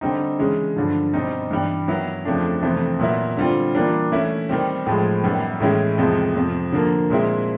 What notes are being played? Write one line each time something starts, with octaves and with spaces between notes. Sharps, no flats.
D3 G3 C4 D#4
C#3 E3 G#3 C#4
G2 D3 F3
B2 G3 C4 D#4
G2 E3 G3
D#3 F#3 B3 E4
F2 C#3 F3 A3 D4
F2 C3 E3 A3 C4
A#2 F#3 B3 E4
D3 G3 C4 F4
E3 G3 A#3 D4 F4
E3 A3 C#4 E4
D#3 G3 C4
A2 F3 G#3
F#2 D#3 G3 B3
A2 E3 G#3 C#4 E4
F2 C3 F3 G#3
F2 C3 F3
D3 F3 A#3
A#2 F3 G#3 C4 E4